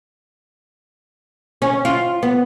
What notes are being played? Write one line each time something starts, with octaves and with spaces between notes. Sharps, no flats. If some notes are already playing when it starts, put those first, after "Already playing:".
C#4
F4
B3